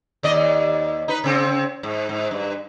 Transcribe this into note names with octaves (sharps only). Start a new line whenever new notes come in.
D#2 D5 D#5
D#4 B4
C#3 C4
G#2
G#2
G2